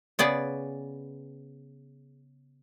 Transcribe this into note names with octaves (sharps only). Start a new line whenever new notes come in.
C#3 B3 G#4 D5